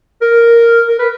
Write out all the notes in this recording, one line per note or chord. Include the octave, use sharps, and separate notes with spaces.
A#4
A#4
B4